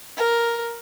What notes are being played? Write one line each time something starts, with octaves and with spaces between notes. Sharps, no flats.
A#4